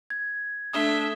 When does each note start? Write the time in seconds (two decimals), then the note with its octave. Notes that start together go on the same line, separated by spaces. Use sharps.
0.10 G#6
0.73 A3 D4 E5 D#6 E7 G7